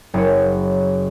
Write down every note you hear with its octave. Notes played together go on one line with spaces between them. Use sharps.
F#1 C#5